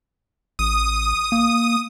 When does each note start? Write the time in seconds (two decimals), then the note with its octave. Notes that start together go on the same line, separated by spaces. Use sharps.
0.59 A1 D#6
1.32 A#3